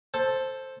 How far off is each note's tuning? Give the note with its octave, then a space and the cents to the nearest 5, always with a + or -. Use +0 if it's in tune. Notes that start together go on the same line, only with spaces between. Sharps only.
A4 +0 C5 +10